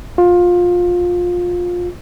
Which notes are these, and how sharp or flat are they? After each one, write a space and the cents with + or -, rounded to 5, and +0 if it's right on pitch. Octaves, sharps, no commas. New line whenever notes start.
F4 +20